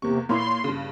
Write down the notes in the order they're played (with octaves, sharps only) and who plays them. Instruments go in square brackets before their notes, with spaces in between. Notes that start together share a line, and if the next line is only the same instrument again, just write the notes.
[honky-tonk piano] E2 C#6 [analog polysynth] C3 A#3
[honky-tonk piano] A#2 C#5 B5 [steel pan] A#3 E4 [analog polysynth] C6
[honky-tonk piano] G2 C#3